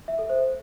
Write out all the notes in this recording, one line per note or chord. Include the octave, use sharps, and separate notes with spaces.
E5
A4
C5